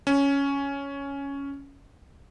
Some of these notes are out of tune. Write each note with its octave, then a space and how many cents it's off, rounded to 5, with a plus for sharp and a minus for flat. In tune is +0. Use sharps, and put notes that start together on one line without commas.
C#4 +5